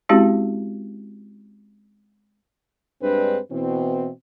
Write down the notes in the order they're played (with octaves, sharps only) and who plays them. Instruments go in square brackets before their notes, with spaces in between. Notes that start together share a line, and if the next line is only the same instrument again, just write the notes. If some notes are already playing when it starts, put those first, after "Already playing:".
[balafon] G#3 C4 C#4 E4 F#4 G4
[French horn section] G2 G#3 C4 D4 B4
B2 E3 C4